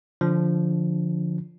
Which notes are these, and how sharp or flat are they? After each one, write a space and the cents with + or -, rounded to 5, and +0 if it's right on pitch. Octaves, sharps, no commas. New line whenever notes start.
D3 +0 F3 +0 D4 -25